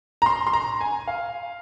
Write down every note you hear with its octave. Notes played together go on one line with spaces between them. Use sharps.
A#5
C6
C6
A#5
G#5
F5